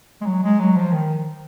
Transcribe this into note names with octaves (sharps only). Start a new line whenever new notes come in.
G#3
F#3
G#3
F#3
F3
D#3